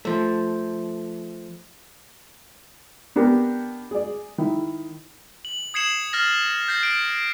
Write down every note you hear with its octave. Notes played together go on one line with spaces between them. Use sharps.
F3 A3
B3 D4 G4 A#4 G5
G#4 D5
D#3 E4
F#7
D#6 G#6 C7 C#7 E7 F#7
F6 A6 A#6
G6 A6 A#6 C7
D7